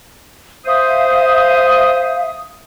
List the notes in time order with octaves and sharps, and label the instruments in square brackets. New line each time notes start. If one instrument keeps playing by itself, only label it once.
[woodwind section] C5 D#6 [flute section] E5 F5